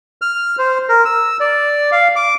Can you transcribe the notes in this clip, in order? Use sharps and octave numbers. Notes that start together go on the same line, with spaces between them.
F6
C5
A#4
E6
D5
F5
D6